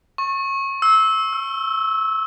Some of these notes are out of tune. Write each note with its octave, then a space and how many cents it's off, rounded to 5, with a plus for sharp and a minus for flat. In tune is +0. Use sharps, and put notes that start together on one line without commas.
C#6 -25
E6 -20
E6 +20